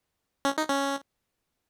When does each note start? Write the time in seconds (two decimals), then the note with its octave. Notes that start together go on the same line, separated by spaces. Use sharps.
0.45 C#4
0.58 D#4
0.69 C#4